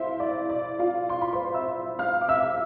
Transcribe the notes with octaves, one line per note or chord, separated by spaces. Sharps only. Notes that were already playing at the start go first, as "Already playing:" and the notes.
Already playing: E4 C5 E5 F5 C6
D5
D5
F4 F5
C6
B5
C5 C6
E5 E6
F5 F6
D6
E5 E6